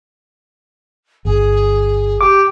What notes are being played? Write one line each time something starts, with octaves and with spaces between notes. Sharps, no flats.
G1 G#4
G4 D6